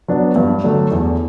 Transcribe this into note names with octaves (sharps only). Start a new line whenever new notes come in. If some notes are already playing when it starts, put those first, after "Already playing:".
F#3 B3 D4
G2
D3 F#3 A3 D4
E2